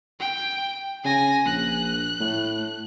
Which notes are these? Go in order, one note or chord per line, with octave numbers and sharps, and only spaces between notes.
G5
C#3 G#5 A#6
A#1 F#6
A2